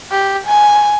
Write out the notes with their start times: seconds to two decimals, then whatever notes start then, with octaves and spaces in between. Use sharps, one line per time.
0.11 G4
0.47 G#5